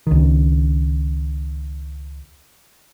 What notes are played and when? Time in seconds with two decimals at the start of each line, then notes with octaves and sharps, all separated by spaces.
0.07 C#2 D#3